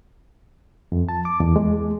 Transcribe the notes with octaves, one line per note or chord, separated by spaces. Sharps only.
F2
A5
D6
E2
G#3